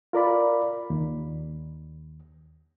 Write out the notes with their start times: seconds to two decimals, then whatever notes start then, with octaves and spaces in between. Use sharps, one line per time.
0.13 F4 A#4 D5 B5
0.90 D#2